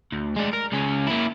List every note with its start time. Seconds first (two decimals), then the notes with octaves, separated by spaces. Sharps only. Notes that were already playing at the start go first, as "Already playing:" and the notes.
0.12 D2
0.36 G#3 D4
0.53 A#4
0.72 C#2 C#4
1.07 A#3 E4